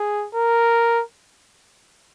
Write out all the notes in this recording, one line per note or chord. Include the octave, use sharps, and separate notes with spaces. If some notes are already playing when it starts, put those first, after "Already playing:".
Already playing: G#4
A#4